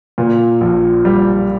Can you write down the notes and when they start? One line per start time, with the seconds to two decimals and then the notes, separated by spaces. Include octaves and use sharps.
0.18 A#2
0.61 A#1
1.05 G3